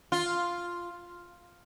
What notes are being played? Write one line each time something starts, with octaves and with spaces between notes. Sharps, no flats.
F4